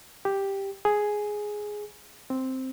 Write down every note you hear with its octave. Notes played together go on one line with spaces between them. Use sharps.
G4
G#4
C4